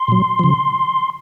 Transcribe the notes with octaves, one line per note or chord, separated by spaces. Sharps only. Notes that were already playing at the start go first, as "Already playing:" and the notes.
Already playing: C6
A#2 F#3
C#3 F3